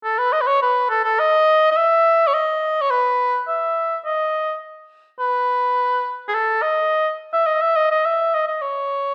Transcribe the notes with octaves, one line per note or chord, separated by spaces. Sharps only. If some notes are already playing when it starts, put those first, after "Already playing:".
A4
B4
D#5
B4
C#5
B4
A4
A4
D#5
D#5
E5
C#5
D#5
C#5
B4
E5
D#5
B4
G#4
A4
D#5
E5
D#5
E5
D#5
D#5
E5
D#5
D#5
C#5